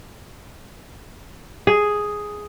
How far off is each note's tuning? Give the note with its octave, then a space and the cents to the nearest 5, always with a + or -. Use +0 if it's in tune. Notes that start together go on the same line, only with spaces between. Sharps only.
G#4 +0